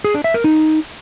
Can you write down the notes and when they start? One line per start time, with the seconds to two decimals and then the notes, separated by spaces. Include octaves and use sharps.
0.04 G#4
0.14 D4
0.24 E5
0.34 A#4
0.44 D#4